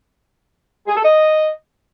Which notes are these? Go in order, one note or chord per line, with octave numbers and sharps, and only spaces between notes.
G#4
A4
D#5